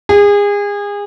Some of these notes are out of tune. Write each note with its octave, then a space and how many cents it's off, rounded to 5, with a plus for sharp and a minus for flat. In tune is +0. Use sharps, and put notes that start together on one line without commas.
G#4 -30